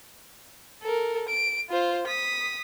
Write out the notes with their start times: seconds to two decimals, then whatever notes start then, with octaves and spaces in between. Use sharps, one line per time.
0.82 A4 A#4
1.28 D7
1.70 F4 C5
2.07 D#6 B6